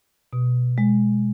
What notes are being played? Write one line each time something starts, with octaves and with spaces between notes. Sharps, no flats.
B2
G#3